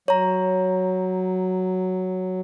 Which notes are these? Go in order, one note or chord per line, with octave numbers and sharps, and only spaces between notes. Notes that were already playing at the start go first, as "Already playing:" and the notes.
F#3 C#5 A#5